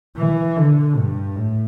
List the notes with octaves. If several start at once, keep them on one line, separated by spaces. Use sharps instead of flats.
E3
D3
G2
A2